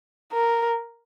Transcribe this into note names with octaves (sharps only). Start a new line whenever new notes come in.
A#4